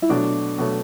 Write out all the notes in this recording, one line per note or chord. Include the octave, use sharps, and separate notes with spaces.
E4
B2 F#3 A3 D4
B2 F#3 A3